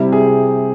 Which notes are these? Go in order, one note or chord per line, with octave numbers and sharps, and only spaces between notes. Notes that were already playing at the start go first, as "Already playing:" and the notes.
Already playing: C3 G3 C4 E4
G#4